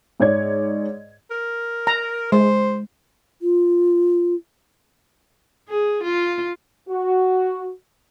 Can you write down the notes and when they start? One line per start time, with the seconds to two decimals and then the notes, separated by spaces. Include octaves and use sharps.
0.20 G#2 C#5 D5 G#6
1.31 A#4
1.87 A#5
2.32 G#3 C5
3.42 F4
5.69 G#4
6.04 F4
6.89 F#4